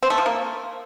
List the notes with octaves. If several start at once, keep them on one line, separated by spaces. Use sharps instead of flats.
C4
A3
F3
A#3